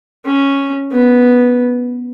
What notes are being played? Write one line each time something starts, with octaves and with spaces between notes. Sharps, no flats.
C#4
B3